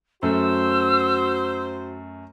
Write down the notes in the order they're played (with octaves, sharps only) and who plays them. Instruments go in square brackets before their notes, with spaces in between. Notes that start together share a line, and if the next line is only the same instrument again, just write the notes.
[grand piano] F#2 A3 [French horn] F#4 [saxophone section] C5 [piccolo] E6